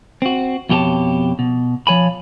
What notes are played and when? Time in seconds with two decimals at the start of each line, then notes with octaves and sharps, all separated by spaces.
0.22 C4 F#4
0.69 F2 B2 G4 G#4 C#5 A5
1.39 B2
1.87 F3 C#5 G#5 B5